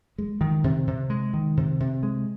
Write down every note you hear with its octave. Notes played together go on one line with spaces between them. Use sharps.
G#3
D#3
C3
C3
G#3
D#3
C3
C3
G#3